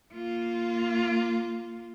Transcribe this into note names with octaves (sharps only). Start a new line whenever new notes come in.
A#3 F4